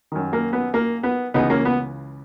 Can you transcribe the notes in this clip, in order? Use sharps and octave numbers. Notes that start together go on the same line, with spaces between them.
F#2 D#3
A#3
B3
A#3
B3
C#2 C#3 E3 B3 D#4
A#3 C#4
B3